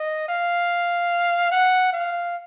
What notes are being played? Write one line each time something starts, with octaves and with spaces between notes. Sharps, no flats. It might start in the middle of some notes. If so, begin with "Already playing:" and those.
Already playing: D#5
F5
F#5
F5